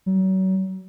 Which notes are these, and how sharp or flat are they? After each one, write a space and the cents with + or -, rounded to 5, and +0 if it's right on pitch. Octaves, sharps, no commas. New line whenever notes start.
F#3 +35